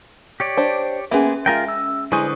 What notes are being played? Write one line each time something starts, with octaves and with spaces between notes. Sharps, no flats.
G4 C#5 D5
D4 C5
A#3 B3 C#4 G#4 E5
G#3 F4 A#4 G5
E6
D3 G#3 E4 B4 C5 C#6 D#6